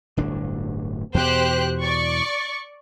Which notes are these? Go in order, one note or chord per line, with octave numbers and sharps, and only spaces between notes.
D1 G1 D4
E2 B2 G4 C5 F#6
D5 C#6